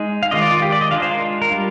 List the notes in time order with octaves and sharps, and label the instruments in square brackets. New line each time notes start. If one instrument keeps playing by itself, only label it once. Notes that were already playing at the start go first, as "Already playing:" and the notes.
Already playing: [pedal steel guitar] G#3 D#4
F5
D#3 G#3 D4 F4 D#5
D5
F4
G4
D5
D#5
G#3 D4 F4 F5
C5
A#4
A#4
G3 D4 F4